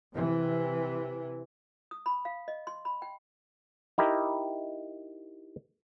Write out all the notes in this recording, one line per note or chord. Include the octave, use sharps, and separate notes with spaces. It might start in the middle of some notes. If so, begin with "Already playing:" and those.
C3 E3
D#6
B5
F5
D#5
C6
B5
G5
D#4 E4 G4 A#4